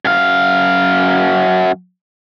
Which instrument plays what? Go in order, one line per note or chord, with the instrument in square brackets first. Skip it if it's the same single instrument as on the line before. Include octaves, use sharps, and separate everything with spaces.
[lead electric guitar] F#2 F5